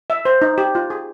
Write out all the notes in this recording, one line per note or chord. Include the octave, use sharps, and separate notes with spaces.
E5
C5
D#4
G4
F4
G#4